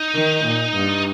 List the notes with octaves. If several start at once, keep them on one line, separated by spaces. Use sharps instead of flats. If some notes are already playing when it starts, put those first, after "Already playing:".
Already playing: D#4
D#3
A#2
G2